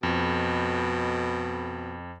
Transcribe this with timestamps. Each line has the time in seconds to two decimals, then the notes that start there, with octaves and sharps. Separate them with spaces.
0.03 F2 B2